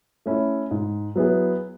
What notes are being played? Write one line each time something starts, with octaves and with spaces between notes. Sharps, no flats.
A3 C#4 E4
G#2
F#3 B3 E4 G#4